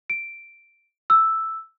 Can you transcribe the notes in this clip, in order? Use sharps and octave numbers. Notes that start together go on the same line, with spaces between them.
D7
E6